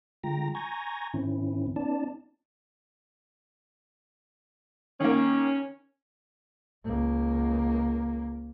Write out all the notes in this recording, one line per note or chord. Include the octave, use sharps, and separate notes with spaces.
D3 G#3 F4 G5 A#5 A#6
G#5 A#5 C#6 G6 G#6 A#6
G#2 D#3 C4 C#4 E4
B3 C#4 D#4 D5 A5
D#3 A#3 C#4
C#2 A#3